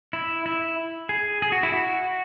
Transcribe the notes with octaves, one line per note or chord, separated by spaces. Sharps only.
E4
E4
G#4
G#4
F#4
E4
F#4